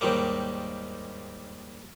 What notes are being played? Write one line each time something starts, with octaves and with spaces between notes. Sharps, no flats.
D#2 G#2 D#3 G3 A#3